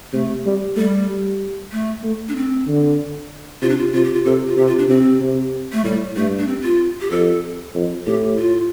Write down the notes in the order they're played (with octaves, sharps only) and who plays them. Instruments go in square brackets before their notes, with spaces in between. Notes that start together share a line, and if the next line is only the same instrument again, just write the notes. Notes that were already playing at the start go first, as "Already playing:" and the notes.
[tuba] C3 [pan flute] A3
[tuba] G3
[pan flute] G3 [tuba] A3
[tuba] G3
[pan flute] A3
[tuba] A3
[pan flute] D4
C4
[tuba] D3
[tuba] C3 [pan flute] F4
[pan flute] D4
F4
[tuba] C3 [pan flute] F4
[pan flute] G4
F4
[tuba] C3 [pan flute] A4
[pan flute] F4
[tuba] C3 [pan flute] G4
[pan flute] F4
D4
[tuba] C3 [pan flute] C4
[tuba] C3
[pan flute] A3
[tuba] A2 [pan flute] G3
[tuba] G2 [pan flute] A3
[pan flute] D4
C4
F4
G4
[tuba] F2 [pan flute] A4
[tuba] F2
[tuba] A2 [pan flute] G4
[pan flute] F4